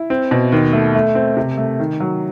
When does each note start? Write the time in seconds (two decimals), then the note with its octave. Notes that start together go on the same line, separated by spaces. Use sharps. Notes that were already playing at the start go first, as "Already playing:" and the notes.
Already playing: E4
0.10 C4
0.31 B2
0.52 D#2
0.73 A3
0.95 A3
1.15 C4
1.37 C3
1.58 A3
1.80 D#3
2.00 F#3